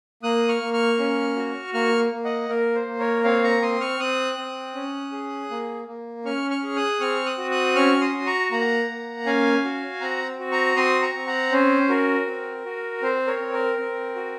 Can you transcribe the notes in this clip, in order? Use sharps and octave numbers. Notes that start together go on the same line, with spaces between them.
A#3 D#6 F#6
C#6 F6
A#3
C#6 F6
C#4
F#4
A#3 C#6 F6
A#3
D#5 F#5
A#3 A#4
C5
A#3
A#4 C#5
C4 C#5 F5
A#5 C#6
C4 C6 D#6
C#6 F6
C4 D#6 F#6
C4
C#4
G#4
A#3
A#3
C#4 C#6 F6
C#6 F6
G#4
D#6 F#6
C4 C#6 F6
D#6 F#6
F#4
D#6 F#6
C#4 C#6 F6
C6 D#6
F#4
A#5 C#6
A#3 F#5 A#5
A#3
C#4 F5 G#5
F#4
C4 F#5 A#5
F#4
A#5 C#6
C4 C6 D#6
A#5 C#6
C4
F#5 A#5
C#4 C5
F#4 A#4
C4
F#4
C4 C5
A#4 C#5
C4
A#4
C4
F#4